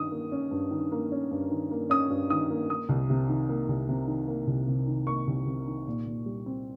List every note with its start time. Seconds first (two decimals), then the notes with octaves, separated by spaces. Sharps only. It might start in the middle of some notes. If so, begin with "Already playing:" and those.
Already playing: G2 D#3 C#4 D#6
0.12 A#3
0.32 C#4
0.51 G2
0.71 D#3
0.92 A#3
1.12 C#4
1.31 G2
1.51 D#3
1.71 A#3
1.90 C#4 D#6
2.10 G2
2.30 D#3 D#6
2.50 A#3
2.69 A#3 D#6
2.89 C2
3.10 C3
3.29 D#3
3.49 A#3
3.69 C2
3.89 C3
4.08 D#3
4.28 A#3
4.47 C2
4.67 C3
4.87 D#3
5.07 A#3 C#6
5.27 C2
5.47 C3
5.67 D#3
5.87 A#2
6.06 A#2
6.26 G3
6.46 C4